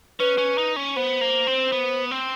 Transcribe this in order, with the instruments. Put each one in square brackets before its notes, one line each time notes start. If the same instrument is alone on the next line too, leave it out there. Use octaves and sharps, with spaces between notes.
[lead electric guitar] C#4 [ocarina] B4
[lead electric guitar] C#4
D#4
C#4
[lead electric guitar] B3 [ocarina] C5
[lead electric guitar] A#3
C4
B3
C4